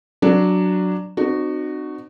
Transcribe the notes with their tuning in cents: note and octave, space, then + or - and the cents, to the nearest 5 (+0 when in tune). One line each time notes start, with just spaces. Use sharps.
F#3 +0 D4 +0 F#4 +0
C4 -20 D#4 -45 F#4 +0